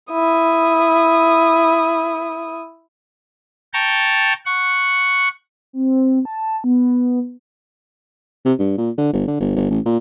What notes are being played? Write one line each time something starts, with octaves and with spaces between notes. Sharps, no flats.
E4 D#6
G5 A5 A#5 C#6 A6
F#5 C#6
C4
A5
B3
C3
G2
A#2
D3
G1
D3
G1
G1
A1
A#2